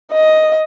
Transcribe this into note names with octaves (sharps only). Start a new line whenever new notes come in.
D#5